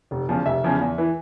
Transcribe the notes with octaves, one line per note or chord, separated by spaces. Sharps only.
F1
E2 C#3 F3
F1 E5
E2 C#3 F3
E2
E3